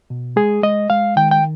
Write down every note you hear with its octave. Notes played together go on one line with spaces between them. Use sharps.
B2
G#3 G#4
G#3 D#5
G#3 F5
D#3 G5
G5